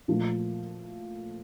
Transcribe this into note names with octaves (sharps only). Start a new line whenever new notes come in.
A#2 F3 A3